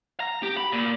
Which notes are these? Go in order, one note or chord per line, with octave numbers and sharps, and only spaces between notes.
A#5
G4
B5
A#2